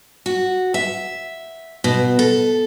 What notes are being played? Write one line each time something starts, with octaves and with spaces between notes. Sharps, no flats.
F#4
E5
B2
A4